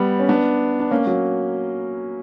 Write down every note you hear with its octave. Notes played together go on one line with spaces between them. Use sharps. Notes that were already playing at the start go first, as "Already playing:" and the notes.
Already playing: G3 B3
C#4
B3 D4
D4
A#3 C#4
F#3 A#3